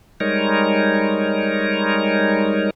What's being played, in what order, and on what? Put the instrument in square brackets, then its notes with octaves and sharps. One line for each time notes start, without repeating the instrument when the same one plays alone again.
[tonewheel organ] G3 G#3 D#4 A#4 C#5